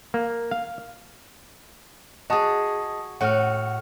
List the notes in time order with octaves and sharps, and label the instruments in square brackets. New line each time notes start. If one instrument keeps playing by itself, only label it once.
[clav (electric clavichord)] A#3
F5
[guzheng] F#4 G#4 [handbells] D#5 A5 D#6
[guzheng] A2 F#4 [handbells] F#5 F6